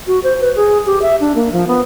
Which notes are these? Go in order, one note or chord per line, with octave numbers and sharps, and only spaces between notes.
F#4
C5
B4
G#4
G4
E5
D4
A#3
F3
B3